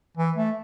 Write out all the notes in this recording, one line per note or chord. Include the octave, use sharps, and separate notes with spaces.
E3
A3